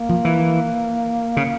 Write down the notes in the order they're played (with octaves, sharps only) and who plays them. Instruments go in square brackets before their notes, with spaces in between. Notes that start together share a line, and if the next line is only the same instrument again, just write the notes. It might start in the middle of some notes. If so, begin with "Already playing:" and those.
Already playing: [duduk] A#3
[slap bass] F3
E3
C#3